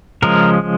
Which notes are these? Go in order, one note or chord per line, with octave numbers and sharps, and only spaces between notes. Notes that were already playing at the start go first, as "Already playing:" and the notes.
C#3 F3 G#3 A#4